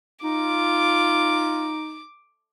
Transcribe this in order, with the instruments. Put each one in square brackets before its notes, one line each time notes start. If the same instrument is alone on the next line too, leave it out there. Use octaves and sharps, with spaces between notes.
[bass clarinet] D#4 [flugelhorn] F4 [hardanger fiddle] D6